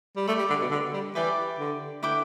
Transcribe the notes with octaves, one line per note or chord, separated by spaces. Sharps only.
G3
A3 G4 D5 B5
G3
D3
B2
D3
G3
E3 G4 B4 D5 B5
D3
D3 E4 B4 G5 D6